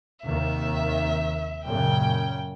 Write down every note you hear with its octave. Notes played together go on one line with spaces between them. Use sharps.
D#2 C3 D#3 E5
F#2 A#2 C#3 G5